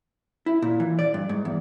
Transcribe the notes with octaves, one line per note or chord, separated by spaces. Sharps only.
E4
A#2
E3
D5
G2
G#2
E2